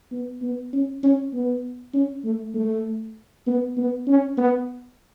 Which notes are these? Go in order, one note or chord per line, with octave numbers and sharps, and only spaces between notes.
B3
B3
C#4
C#4
B3
C#4
A3
A3
B3
B3
C#4
B3